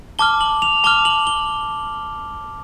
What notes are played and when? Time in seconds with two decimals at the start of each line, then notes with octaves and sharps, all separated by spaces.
0.19 A5 D6 F6 G7
0.41 F#7
0.62 F7
0.84 A5 D6 F6 G7
1.05 F#7
1.27 G7